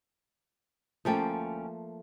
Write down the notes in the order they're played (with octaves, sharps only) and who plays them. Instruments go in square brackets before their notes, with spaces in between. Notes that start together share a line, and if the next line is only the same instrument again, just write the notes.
[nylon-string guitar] D2 C#4 G5 [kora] F3 A3 A#3